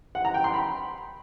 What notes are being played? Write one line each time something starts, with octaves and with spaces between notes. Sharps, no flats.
F#5
A#5
G5
C6
B5